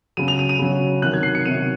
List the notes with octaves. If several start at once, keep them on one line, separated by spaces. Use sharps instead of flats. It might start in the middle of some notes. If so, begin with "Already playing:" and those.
C#3 F#3 D#7
F7
D#7
D#7
C#3 F#3
C3 D#3 F#3 F#6
G#6
C7
C#7
C3 D#3 F#3 D#7